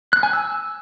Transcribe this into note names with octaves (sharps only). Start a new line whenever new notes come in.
F#6
G#5
E6